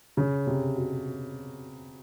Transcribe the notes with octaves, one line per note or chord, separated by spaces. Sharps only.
C#3
C3
B2